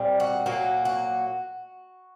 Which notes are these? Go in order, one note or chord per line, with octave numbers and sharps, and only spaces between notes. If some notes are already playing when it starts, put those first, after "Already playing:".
Already playing: A#2 G3 C4
F#4
A#2 F#3 A#3 F#4
F#4